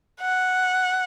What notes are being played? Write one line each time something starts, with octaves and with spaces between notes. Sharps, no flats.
F#5